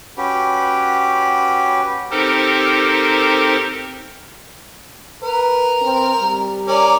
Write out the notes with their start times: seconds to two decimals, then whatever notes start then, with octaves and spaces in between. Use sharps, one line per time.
0.17 C#4 F#4 G4 B4
2.11 C4 D#4 G4 A4 A#4 C5
5.22 A#4 B4
5.82 C4
6.20 G3
6.67 C#4 A#4 D5